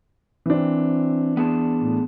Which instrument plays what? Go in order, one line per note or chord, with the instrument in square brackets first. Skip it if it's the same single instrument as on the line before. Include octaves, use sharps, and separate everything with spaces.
[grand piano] E3 D4 [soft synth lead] C4
[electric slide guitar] B3 G#4 A5
[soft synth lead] A2